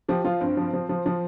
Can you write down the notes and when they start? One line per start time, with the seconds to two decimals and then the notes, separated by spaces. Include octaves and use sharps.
0.08 F3 G4
0.24 F3 F4
0.41 G2 C4
0.57 F3
0.74 F3
0.89 F3
1.06 F3